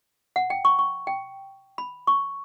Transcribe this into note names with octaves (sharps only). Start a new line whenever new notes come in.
F#5
G5
C#6
C#6
G5
B5
C#6